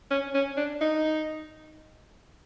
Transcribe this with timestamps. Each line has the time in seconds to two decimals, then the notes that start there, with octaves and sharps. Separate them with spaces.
0.11 C#4
0.34 C#4
0.57 D4
0.81 D#4